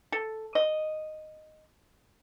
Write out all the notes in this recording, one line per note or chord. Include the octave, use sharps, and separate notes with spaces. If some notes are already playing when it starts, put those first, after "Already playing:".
A4
D#5